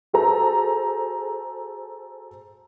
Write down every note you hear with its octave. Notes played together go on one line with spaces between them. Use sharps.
F#4 G#4 A4 C5 A#5